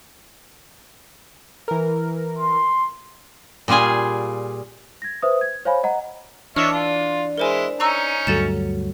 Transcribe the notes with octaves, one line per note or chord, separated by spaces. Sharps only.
E3 A#4
C6
A#2 G3 F4 G#4 G#5
G#6 A#6
B4 C5 E5 D#6
G#6
C5 C#5 F5 G#5 B5
D#5 F#5 A#5
E3 D4 C#5 D#5 E5 F6
F4
G#3 E4 A#4 C5 G#5
C#4 D#4 A#5 C#6 E6
D2 G2 F#3 A4 A6 E7